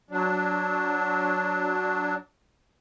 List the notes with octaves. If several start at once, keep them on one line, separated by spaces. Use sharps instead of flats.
F#3 D4